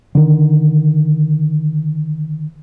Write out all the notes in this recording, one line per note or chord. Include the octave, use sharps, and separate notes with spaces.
D3 D#3